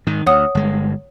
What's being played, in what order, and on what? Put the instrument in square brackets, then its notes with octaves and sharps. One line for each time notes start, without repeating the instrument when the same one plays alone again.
[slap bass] G#2 D#3
[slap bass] D2 [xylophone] C#5 F#5 D#6
[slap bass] G1 G#3